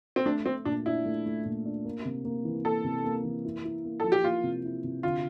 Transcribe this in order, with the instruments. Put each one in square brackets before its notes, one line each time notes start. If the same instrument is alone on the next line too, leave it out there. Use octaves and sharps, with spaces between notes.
[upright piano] C4
[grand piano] A3 [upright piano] D4
[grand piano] A3 [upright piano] C4
[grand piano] A#2 [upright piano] D4
[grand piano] D4 [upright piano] E4
[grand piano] A3
A3
A#2
D4
A#3
C3
A#3
E3
[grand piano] A#3 [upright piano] A4
[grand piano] C3
A#3
E3
E4
E4
A#3
[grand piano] F3 [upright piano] A4
[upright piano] G4
[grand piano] A#3 [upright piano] F4
[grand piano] C3
E4
C3
[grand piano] D3 [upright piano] F4